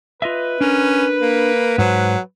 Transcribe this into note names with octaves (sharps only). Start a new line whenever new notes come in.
F4 B4 D#5 E5
C#4 D4 A#4
A#3
G#2 F#3 C5